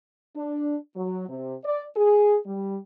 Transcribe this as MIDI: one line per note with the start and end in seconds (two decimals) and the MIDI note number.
0.36 0.76 62
0.96 1.27 54
1.29 1.56 48
1.65 1.84 74
1.96 2.37 68
2.46 2.78 55